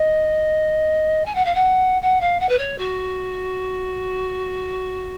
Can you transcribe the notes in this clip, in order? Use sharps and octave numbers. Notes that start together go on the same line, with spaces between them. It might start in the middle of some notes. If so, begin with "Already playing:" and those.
Already playing: D#5
G#5
F#5
F5
F#5
F#5
F5
F#5
B4
C#5
F#4